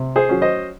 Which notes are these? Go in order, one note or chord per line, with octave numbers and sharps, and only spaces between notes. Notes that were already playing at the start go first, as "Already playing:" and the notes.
Already playing: C3
G#4 C5
F#3 C#4
C5 D#5